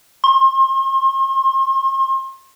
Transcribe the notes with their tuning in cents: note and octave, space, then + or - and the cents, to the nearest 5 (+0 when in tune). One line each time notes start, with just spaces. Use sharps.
C6 +35